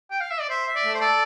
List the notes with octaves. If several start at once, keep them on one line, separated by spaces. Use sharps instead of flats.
G5
F5
E5
D5
C5 E5
E5
D5
A3
C5
A4 D5